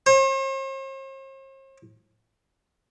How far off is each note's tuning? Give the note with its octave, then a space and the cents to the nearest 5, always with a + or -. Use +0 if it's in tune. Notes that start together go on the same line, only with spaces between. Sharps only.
C5 +45